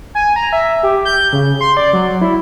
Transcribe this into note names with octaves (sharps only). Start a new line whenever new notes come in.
G#5
A#5
E5
G4
G6
C#3
C6
D5
F#3
E4